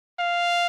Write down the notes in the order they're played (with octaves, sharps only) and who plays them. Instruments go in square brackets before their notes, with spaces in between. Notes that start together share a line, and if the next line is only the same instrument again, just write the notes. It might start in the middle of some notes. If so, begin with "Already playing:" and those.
[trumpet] F5